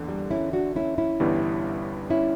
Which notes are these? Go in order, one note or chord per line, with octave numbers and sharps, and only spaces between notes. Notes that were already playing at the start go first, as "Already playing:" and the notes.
Already playing: E2 D3 A#3
G3
C#4 E4
D4 F#4
C#4 E4
C#4 E4
G1 G2 E3 G3 B3
C#4 E4